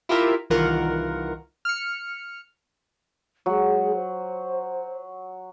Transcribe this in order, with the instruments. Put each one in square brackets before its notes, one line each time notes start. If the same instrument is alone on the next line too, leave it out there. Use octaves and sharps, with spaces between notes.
[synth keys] E4 F4 G4 A#4 E5
C2 D#3 E3 F4 A#4 F#5
F6 C#7
[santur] F#3 [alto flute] G#3
[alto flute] C5